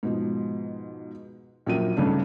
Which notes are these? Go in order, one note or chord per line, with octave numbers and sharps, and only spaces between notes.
G#2 B2 F3
A#1 F3 F#3 A#3 D#7
G2 C#3 A3 D4 D#4